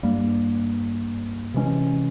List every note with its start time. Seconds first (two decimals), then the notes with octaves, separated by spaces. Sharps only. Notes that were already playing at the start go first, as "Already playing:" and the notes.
0.03 G2 G3 A#3
1.54 C3 E3 G#3 C#4